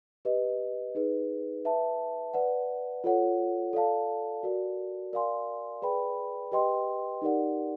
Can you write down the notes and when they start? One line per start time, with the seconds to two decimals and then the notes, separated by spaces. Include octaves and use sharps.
0.25 G4 B4 D#5
0.95 D#4 G#4 B4
1.65 B4 E5 A5
2.34 B4 D5 F#5
3.04 F4 A4 C#5 F#5
3.73 A4 D5 F5 A5
4.43 F#4 A#4 D5
5.13 A#4 D5 F5 G#5 C6
5.82 G#4 B4 D5 G5 B5
6.52 G4 B4 D#5 G5 C6
7.22 D#4 G4 A#4 D5 F#5